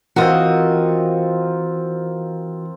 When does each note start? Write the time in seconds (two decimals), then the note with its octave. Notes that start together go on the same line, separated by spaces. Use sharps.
0.16 E3 C4 F4 F#4 A#4 D#5